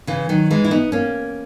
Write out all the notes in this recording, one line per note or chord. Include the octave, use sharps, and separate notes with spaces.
C#3 E3
D#3 F#3
E3 G#3
E4
B3 D#4
A#3 C#4